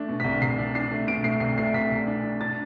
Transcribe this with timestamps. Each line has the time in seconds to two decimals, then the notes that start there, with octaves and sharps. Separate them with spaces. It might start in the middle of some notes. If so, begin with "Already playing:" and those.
Already playing: A3 D4
0.09 B2
0.20 C2 B6
0.42 C2 C7
0.58 D4
0.75 D4 C7
0.92 A3
1.07 B2 D7
1.24 A3 C7
1.40 C2 C7
1.58 A3 C7
1.74 C2 B6
1.91 C2
2.07 D4
2.23 D4
2.41 D4 A6